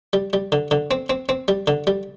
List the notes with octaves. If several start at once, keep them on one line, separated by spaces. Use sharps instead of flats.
G3
G3
D3
D3
C4
C4
C4
G3
D3
G3